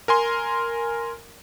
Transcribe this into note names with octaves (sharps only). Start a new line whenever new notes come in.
A#4 G#5 C6